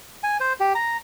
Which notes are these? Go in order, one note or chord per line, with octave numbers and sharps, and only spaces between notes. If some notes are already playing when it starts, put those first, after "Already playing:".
G#5
C5
G4
A#5